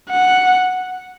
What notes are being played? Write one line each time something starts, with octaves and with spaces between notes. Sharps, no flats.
F#5